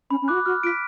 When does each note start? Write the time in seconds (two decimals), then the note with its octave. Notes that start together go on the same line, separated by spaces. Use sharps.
0.10 C#4 B5
0.22 C#4
0.28 F4 D6 F#6
0.33 F#4
0.46 F#4 F6
0.63 F4 B6 D7